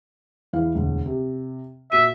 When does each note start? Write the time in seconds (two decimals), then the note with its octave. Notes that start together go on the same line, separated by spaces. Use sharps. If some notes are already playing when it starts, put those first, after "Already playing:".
0.53 E2 E3 F5
0.75 E1 D2
1.06 C3
1.92 A#2 F#4 E5 D#7